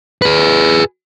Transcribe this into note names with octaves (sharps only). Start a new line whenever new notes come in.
G#4 B4